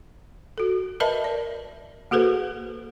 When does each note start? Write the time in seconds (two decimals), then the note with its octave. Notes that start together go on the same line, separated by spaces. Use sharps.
0.58 F#4 A4
1.00 A#4 B4 D#5 E5 A5 B5
1.24 D5
2.11 A#3 F#4 G#4 A4 B4 C5